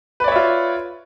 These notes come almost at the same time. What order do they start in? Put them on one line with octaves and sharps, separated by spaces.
B4 D5 C#5 E5 F4